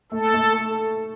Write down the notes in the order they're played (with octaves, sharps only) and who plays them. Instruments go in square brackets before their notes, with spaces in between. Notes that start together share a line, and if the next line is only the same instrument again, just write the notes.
[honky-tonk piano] A3 [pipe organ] A4
[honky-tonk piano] A3